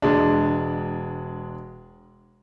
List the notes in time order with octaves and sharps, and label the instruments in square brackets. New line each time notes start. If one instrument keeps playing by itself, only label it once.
[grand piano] E1 G#3 D4